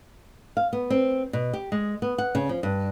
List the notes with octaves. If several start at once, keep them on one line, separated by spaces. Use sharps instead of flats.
F5
B3
C4
B2
G4
G#3
B3
F#5
C#3
F3
G2